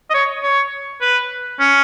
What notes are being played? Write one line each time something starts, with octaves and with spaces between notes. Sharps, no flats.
D#5
C#5
C#5
B4
C#4